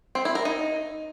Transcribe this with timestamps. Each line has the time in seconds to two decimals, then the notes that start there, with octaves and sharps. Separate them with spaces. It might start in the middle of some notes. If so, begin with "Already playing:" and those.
0.15 C4
0.25 E4
0.35 A#4
0.45 D#4